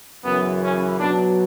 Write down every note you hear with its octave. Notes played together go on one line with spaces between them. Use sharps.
F#2 C#3 E3 B3
C#4
B2 F#3 D4